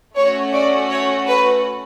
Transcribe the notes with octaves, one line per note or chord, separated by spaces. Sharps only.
A3 C#4 F#4 C#5
D5
C#5
B4